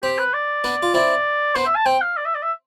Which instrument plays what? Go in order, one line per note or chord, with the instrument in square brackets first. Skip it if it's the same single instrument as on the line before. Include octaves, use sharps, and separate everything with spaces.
[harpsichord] C4 [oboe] G4
[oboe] B4
D5
[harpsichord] B3 D4
F4
[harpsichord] C4 E4 [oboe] D5
[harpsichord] B3 D4 [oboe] C5
[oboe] E5
A5
[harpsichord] C4 [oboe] G5
[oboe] F5
D5
E5
D5
E5